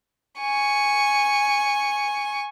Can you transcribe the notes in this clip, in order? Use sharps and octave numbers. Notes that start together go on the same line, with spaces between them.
G#5 C#6